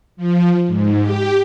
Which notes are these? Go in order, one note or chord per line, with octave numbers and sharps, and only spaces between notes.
F3
G#2
G4